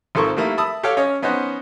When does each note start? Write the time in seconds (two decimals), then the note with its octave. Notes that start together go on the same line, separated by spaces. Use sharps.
0.15 G#1 F3 A4 A#4 C#6
0.36 D#3 G3 A3 A#3 E4
0.58 E5 A5 B5 D#6 E6
0.83 G4 A4 C#5 F5 G5
0.97 C#4 C#5 D#5
1.22 B3 C#4 D#4 C5 F#5